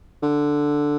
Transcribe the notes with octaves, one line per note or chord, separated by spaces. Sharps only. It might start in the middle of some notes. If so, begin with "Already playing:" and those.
D3